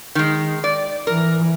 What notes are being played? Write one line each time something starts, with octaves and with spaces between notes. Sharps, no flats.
D#3 G#3
D5
E3 A#4